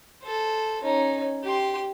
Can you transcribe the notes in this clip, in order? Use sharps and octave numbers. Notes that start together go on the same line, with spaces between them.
A4 C5
C#4 D#4
G4 C6